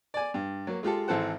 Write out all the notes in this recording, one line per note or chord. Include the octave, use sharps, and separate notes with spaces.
D5 G#5
G2
F#3 A#3
G#3 F4 G4 A4
G#1 E3 A4 C5 F#5